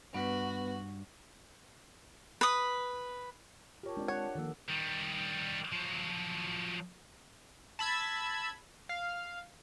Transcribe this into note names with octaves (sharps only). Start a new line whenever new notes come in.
G2 B3 F#4 B4
B4 D#6
F4 G4 A#4 C#5 A5
G#3 B3 C4 D4 D5
C#5 F#5
D#3 F3 A#3 A4 E6
D#3 G3
F3 F#3
A5 B5 E6 G#6
F5